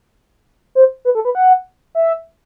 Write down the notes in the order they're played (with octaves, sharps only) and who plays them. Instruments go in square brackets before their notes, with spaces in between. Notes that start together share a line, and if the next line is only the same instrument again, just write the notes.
[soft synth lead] C5
B4
A4
B4
F#5
E5